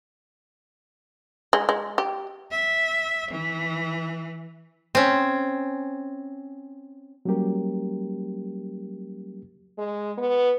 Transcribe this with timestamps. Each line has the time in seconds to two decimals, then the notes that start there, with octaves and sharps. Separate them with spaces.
1.53 G#3
1.69 G#3
1.98 G4
2.51 E5
3.31 E3
4.95 C4 C#4
7.25 F#3 G3 A#3 C#4 G4 A#4
9.78 G#3
10.18 B3